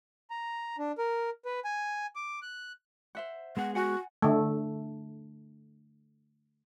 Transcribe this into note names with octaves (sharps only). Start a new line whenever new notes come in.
A#5
D4
A#4
B4
G#5
D6
F#6
C5 E5 F#5
G#3 B3 G#4 F#5
F#4 F#5 G#5
D3 A3